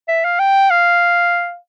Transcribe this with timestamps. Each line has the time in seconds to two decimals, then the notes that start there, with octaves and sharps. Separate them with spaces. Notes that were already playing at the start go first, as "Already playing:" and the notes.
0.08 E5
0.25 F5
0.39 G5
0.70 F5